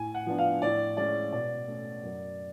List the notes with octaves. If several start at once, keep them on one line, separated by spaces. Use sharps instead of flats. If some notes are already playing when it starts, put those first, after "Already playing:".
Already playing: A2 G#5
F#5
F3 B3 D4
F5
A2 D5
G#3 C#4 D5
B2 D5
A3 C#4
F#2